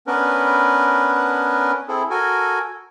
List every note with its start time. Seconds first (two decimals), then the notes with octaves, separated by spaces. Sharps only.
0.07 B3 C#4 D4 A#4 B4
1.88 C4 E4 G#4 A4
2.10 F#4 A4 A#4 G#5